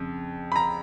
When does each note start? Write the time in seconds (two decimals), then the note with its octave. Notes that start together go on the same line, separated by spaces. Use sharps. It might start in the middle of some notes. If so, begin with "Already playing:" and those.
Already playing: F2 C#3
0.52 B5
0.56 A#5